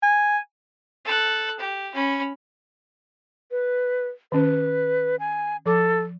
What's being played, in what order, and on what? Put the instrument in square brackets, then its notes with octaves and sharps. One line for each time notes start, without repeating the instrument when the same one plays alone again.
[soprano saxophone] G#5
[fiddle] A4 F#6
G4
C#4 B5
[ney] B4
[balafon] D#3 C#4 [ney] B4
[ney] G#5
[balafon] F3 D6 [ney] A4